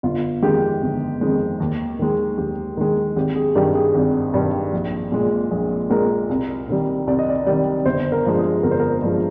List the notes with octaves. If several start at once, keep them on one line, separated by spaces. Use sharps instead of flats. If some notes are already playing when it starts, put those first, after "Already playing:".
G1 F4
F2 D#3 G#3 G4
G1
F2 D#3 G#3
D#2
D#3 G#3
D#2 G4
D#3 G#3
G#1 G4
G#4
G2 D#3 G3 G4
G#4
G#1
G2 D#3 G3
A#1
A#2 G#3
A#1 G#4
A#2 G#3 A#4
C2
C3 D#3 G3
C2 D5
D#5
D5
C3 D#3 G3 D5
G1 C5
A#4
G2 F3 G#3
G#4
G1 A#4
C5
A#4
G2 F3 G#3